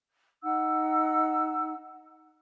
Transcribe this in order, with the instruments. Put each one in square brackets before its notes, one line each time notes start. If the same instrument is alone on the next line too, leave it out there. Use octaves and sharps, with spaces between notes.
[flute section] D#4 F#5 E6